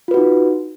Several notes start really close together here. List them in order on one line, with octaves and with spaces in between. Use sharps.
F4 B4 F#4 D#4